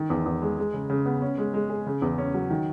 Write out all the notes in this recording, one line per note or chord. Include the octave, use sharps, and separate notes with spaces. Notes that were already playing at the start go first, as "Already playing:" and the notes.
Already playing: D#3
E2
E2
G#3
G#3
C#3
C#3
B3
C#4
G#3
G#3
G#4
C#3
E2
C#4
F#3
D#3